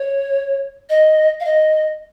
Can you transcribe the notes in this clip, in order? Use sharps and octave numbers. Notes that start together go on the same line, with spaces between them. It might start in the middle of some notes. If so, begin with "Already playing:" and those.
Already playing: C#5
D#5
F5
D#5